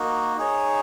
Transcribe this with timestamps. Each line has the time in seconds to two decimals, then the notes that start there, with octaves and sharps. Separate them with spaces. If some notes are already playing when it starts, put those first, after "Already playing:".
Already playing: A#3 D#4 F#4
0.37 D#4 G#4 C#5